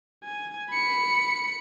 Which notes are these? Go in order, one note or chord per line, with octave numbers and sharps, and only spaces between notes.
G#5
B5 C#7